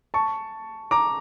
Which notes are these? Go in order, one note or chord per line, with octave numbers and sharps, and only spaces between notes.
A5 C#6
A#5 D6